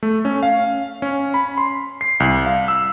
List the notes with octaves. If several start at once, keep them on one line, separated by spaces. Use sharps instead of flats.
A3
C#4
F5
C#4
B5
C6
C7
C2
F5
E6